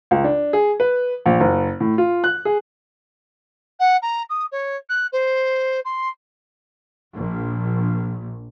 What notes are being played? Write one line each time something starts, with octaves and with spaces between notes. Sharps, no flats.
C#2
D4
G#4
B4
A#1
F#1
A2
F4
F#6
G#4
F#5
A#5
D#6
C#5
F#6
C5
C6
A#1